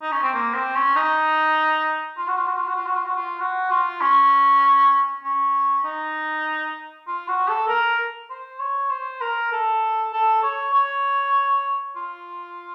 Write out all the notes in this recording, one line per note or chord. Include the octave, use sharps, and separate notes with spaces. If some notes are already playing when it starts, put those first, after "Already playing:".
D#4
C#4
C4
A#3
C4
C#4
D#4
F4
F#4
F4
F#4
F4
F#4
F4
F#4
F4
F#4
F4
F#4
F4
C#4
C#4
D#4
F4
F#4
A4
A#4
C5
C#5
C5
A#4
A4
A4
C#5
C#5
F4